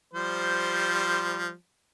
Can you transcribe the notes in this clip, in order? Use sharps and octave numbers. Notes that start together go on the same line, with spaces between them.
F3 G3 C5